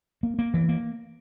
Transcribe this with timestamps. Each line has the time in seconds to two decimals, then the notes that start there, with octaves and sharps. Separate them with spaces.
0.23 A#3
0.39 A#3
0.54 E3
0.69 A#3